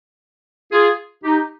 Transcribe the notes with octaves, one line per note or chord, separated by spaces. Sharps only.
F4 G#4
D#4 G4